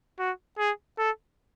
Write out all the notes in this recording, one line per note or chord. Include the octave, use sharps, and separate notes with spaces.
F#4
G#4
A4